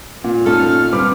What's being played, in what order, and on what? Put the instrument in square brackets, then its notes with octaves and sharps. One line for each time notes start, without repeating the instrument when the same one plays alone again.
[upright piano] A#2
[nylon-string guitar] C#4 D#4 A4 [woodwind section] F6
[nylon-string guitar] D3 G3 [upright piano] C4 B4 D6